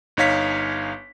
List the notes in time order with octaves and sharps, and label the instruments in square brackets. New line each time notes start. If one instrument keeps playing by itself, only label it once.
[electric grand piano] G1 D#4 C#5 F5 B6